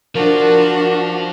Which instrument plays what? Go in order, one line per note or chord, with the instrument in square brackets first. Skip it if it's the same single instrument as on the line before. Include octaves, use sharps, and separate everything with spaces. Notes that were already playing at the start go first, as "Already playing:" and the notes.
[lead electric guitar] F3 F4 [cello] D4 F#4 [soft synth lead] A#4